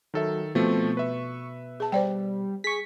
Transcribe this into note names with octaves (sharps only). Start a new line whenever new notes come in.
D#3 F#3 A4 E5
B2 F3 A3 C4 C#6
B4 E5
G#4 A5
G3 C5 D5 G5
G#4 C#6 B6